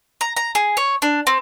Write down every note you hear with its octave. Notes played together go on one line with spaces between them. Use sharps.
A#5
A#5
G#4
C#5
D4
C4